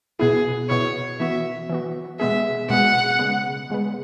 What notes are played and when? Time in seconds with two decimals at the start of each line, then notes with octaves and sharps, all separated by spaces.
0.20 B2 B3 E4 G#4
0.69 B2 B3 E4 C#5
1.20 E3 B3 F#4 E5
1.70 E3 B3 F#4
2.19 B2 G#3 B3 G#4 E5
2.70 B2 G#3 B3 G#4 F#5
3.19 C#3 G#3 B3
3.70 C#3 G#3 B3